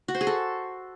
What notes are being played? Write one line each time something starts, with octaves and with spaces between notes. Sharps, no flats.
F#4
C5
G#4
A4